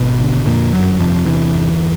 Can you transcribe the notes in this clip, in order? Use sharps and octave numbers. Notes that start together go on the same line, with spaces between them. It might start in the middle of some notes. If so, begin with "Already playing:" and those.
Already playing: G#1 B2 B3
D3
F2 A#2 A#3
G1 F#2 F#3
F2 C3 F3
E2 C3 E3
G1